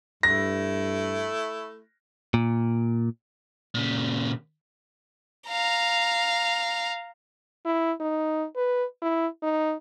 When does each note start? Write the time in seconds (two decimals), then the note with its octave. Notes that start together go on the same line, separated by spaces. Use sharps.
0.23 G2 A3 E4 A#6
2.34 A#2
3.75 A#2 C#3
5.49 F5 A#5
7.65 E4
8.00 D#4
8.56 B4
9.02 E4
9.43 D#4